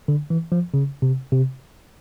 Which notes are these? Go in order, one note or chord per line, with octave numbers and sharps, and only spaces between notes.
D3
E3
F3
C#3
C3
C3